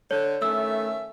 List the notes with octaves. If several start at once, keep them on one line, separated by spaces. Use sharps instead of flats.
D3 C#5
D#3 A3 C#4 E5 E6